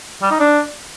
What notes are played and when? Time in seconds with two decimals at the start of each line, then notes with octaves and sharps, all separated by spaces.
0.22 G3
0.31 D#4
0.40 D4